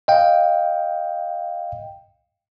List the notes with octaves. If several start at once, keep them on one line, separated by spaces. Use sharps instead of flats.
D#5 F5 G5